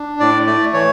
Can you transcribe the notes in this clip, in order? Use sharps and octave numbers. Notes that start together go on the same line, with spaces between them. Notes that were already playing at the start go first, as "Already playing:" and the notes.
Already playing: D4
A2 D5
A3 D5
E3 C#5